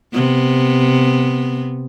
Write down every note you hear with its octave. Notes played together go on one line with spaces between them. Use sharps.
C3 B3